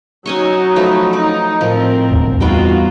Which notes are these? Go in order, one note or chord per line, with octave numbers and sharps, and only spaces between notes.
F#3 C#4 D#4 G#5 C#6
F3 A3 B4
D#4 D5
A2 F3 C4 A#4
E1 D2
E2 G3 B3 D#4 F4 F#4 G5